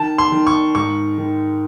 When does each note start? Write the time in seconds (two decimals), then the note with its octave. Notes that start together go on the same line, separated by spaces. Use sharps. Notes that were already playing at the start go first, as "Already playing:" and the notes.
Already playing: D#3 A5
0.18 C6
0.32 D#3
0.47 C#6
0.75 G#2 C#6
1.18 D#3